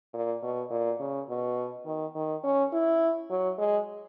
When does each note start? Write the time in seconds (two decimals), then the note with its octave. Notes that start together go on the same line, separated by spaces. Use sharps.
0.14 A#2
0.43 B2
0.71 A#2
1.00 C#3
1.29 B2
1.86 D#3
2.15 D#3
2.44 C#4
2.73 E4
3.30 F#3
3.58 G#3